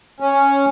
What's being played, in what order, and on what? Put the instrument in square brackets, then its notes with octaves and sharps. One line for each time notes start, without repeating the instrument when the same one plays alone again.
[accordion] C#4